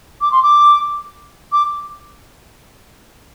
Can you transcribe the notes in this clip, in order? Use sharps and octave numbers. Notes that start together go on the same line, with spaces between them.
D6
C6
D6
D6